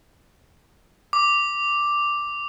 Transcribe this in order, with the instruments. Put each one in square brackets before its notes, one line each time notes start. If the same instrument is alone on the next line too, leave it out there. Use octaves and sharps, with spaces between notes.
[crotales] D6